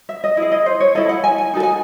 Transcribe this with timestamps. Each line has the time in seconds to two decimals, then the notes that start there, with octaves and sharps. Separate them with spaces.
0.09 E5
0.24 D#5
0.37 E4 D#5
0.42 G#4
0.52 D#5
0.66 C5
0.80 C#5
0.95 E4 A4 D#5
1.09 F#5
1.24 G#5
1.38 G#5
1.54 D#4 F#4 A4
1.63 G#5